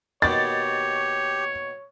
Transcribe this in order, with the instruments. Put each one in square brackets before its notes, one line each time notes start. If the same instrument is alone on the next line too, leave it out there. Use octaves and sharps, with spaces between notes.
[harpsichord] D#2 B2 [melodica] G4 [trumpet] C#5 [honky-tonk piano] A6